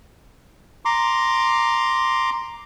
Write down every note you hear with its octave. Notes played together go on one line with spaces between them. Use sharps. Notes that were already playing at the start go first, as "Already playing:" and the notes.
A#5 C6 D6